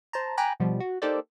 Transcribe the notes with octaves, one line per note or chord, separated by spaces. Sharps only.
C5 A5 A#5
G5 G#5 A#5 B5 D6 F#6
B2 F3 G3
F#4
A#3 D#4 G4 A4 C5 D5